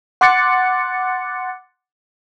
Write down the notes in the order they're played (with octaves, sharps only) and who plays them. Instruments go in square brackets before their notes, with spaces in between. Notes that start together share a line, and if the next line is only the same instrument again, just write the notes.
[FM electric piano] F#5 C6 D6 F#6 A6 C#7